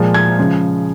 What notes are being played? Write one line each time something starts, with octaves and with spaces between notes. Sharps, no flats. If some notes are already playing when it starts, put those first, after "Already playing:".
Already playing: A#2 F3 G#3
G#6
C#3 F3 G#3